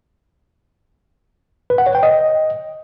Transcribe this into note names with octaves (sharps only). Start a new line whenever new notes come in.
B4
F#5
C#5
G5
D#5